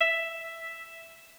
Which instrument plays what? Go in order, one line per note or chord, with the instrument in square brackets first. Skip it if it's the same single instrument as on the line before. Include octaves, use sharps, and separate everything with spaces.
[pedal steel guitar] E5